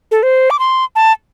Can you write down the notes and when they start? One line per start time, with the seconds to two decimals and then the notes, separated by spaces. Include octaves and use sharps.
0.11 A4
0.23 C5
0.50 D6
0.59 C6
0.96 A5